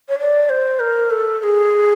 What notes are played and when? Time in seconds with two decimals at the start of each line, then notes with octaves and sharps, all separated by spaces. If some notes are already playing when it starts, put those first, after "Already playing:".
0.09 C#5
0.19 D5
0.50 C5
0.80 A#4
1.11 A4
1.40 A4
1.43 G#4